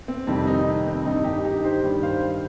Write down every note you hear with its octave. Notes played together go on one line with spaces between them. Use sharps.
C4
F2 C3 D#3 G3 C4
D#4
C4
G2 D#3 G3 D#4
D#4 G4
D#4 G4
G4 C5
G2 D#3 G3
C5 F5